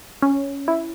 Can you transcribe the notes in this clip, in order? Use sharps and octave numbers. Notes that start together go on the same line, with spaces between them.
C#4
E4